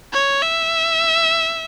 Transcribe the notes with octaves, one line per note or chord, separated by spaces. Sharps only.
C#5
E5